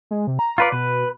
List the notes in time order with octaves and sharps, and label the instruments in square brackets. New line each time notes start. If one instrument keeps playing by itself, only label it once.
[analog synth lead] G#3
C3
A#5
[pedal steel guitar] F4 B4 D5
[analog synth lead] B2 [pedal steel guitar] B4